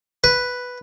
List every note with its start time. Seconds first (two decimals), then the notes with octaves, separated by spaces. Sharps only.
0.24 B4